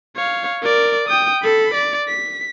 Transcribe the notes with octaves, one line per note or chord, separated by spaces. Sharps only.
C#5 F5
A#4 D5
G5 D#6
A4 B5
D5
B6